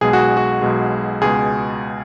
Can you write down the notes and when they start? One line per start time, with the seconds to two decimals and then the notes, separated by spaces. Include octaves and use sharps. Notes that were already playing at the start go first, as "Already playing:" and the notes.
0.01 B1 B2 G#3 G#4
0.13 F#4
0.37 F#4
0.62 B1 B2 G#3
1.21 C#2 B2 G#3 G#4